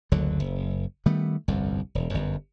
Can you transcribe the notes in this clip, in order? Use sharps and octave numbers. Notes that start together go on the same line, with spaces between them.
F#1 D2 D3 F#3
F#1
D#3 G3 A3 B3
G1 C2 F2
E1
G1 F#2